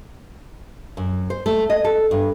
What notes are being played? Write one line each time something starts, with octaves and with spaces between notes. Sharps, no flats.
F#2
C5
A3
D#5
A4
G2